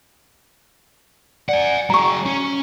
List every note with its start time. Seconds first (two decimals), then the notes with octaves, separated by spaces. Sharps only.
1.49 D5 F#5 G#5
1.90 F#3 G#4 A#5 C#6
2.26 C#4